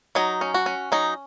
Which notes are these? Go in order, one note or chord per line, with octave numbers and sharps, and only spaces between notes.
F#3 D#4
C#4
F#4
C#4
F#3 D#4